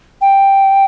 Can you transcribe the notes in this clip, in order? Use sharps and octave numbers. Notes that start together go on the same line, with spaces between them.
G5